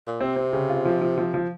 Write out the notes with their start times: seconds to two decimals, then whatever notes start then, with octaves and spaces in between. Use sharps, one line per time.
0.07 A#2
0.21 C3 C4
0.36 C4
0.53 C#3
0.69 F4
0.85 F3
1.01 F3
1.18 F3
1.34 F3